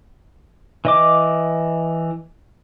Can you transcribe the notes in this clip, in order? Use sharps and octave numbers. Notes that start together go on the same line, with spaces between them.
E3 D#5 D6